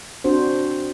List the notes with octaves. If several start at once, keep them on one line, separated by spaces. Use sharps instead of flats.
C4 D4 F#4 C5